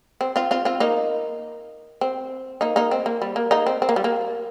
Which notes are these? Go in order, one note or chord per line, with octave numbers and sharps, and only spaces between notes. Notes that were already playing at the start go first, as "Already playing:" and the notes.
C4
C4 F4
C4 F4
C4 F4
A#3 D#4
C4
A#3 D#4
A#3 D#4
C4
A#3
G3
A#3
A#3 D#4
C4
C4
A#3
G3
A#3